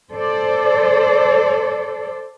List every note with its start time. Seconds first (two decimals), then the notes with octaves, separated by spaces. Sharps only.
0.13 A4 C5 D5